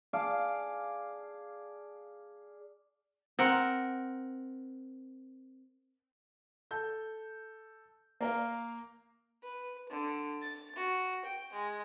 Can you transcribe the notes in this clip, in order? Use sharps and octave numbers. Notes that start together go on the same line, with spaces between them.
G#4 D5 F5 A5
C4 A#4 F#5
A4 G6
A#3 A#4 F5
B4
D3
A6
F#4
G5
G#3